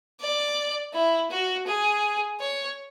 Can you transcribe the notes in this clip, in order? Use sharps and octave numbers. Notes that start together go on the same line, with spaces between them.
D5
E4
F#4
G#4
C#5